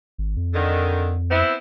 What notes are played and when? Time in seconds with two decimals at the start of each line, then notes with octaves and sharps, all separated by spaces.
0.18 G#1
0.36 F2
0.54 D3 D#3
1.31 B3 C4 E4